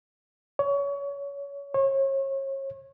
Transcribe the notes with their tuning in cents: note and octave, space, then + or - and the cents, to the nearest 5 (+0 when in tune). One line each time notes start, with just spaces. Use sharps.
C#5 +25
C#5 -35